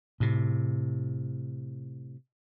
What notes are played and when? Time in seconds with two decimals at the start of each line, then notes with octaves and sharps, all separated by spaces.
0.20 A2 C3